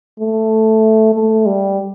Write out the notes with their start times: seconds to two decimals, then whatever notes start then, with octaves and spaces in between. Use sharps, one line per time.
0.20 A3
1.14 A3
1.46 G3